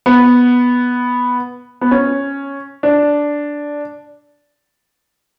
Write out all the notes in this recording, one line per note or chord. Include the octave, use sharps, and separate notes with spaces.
B3
B3
C#4
D4